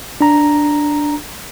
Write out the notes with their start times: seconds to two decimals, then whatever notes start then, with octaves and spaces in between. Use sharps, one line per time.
0.21 D4 A#5